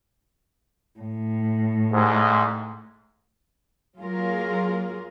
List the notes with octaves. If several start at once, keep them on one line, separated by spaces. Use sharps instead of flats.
A2
C2 G#2
F#3 A#3 F4 G#4 A#4